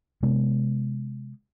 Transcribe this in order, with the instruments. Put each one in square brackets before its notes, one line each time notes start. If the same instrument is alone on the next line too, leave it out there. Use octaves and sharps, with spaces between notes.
[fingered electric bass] C3 G#3 A#3 B3